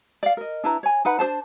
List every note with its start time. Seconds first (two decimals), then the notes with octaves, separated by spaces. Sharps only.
0.23 D5 F5
0.37 A#4 D#5
0.64 D4 E4 B4 A#5
0.83 C#5 G#5
1.05 D#4 B4 F#5 B5
1.19 D4 G#4 C5 A5